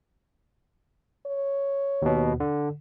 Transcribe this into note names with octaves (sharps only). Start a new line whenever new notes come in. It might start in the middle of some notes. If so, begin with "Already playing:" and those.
C#5
D#2 B2
D3